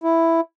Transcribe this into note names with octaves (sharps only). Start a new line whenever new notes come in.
E4